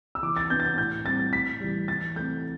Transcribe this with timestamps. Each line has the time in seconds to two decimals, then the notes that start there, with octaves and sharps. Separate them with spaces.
0.15 E6
0.23 E3 D6
0.37 A6
0.50 B3 D4 G6
0.60 A6
0.65 G6
0.78 A2 G6
1.06 G3 C4 A6
1.33 A2 B6
1.60 E3 G3
1.88 E3 A6
2.16 A3 C4 G6